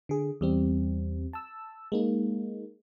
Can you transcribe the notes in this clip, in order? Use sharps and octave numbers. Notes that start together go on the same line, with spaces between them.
D3 G#4
E2 G3 C4
A5 E6
G#3 A#3 D#4